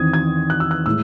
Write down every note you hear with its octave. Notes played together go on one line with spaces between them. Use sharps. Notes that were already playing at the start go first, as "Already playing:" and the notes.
Already playing: E2 D#3 C4 D#6 G#6
G#6
F#6
E6
F#6
A2 G#3 E6